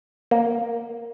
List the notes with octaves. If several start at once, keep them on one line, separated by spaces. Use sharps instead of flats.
A#3